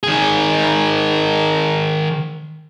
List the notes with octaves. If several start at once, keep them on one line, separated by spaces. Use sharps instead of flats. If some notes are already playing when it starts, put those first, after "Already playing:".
D#3 G#4